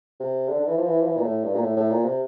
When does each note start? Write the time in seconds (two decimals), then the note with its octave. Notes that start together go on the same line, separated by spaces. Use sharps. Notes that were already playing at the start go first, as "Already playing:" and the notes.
0.20 C3
0.48 D3
0.60 D3
0.67 E3
0.78 F3
0.86 E3
1.01 F3
1.05 E3
1.17 A#2
1.24 A2
1.43 G2
1.54 A#2
1.62 A2
1.77 A2
1.91 A#2
2.05 C3